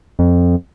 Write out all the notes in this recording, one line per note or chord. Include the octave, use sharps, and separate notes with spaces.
F2